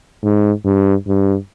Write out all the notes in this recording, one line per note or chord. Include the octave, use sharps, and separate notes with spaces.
G#2
G2
G2